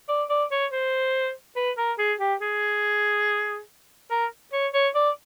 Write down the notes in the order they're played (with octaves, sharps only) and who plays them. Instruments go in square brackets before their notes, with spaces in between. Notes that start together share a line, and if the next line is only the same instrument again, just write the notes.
[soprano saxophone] D5
D5
C#5
C5
B4
A#4
G#4
G4
G#4
A#4
C#5
C#5
D5